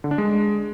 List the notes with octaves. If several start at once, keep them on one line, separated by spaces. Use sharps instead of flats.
D3
D4
G#3